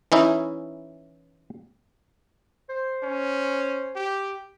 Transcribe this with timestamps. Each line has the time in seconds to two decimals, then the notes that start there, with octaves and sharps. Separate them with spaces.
0.12 E3 C#4 D#4 E4
2.70 C5
3.03 C#4
3.96 G4